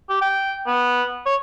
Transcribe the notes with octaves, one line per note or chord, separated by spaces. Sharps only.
G4
G5
B3
C#5